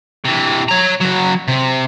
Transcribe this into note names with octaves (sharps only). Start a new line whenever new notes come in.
C3 E3
C#5 A#5
C#3 F#3
C3